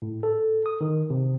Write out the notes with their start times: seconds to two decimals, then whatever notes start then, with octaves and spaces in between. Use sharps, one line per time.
0.02 A2
0.23 A4
0.66 D#6
0.81 D#3
1.10 C3